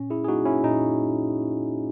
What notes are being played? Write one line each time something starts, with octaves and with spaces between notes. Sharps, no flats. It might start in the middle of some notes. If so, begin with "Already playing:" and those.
Already playing: A#2 C#4
E4 G#4
G#4
F#3 A#3 D#4 F#4
C#4 E4
A#2 D#4